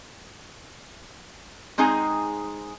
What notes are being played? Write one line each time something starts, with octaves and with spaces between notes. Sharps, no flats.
G#3 C4 D#4 G#4 G#5 A#5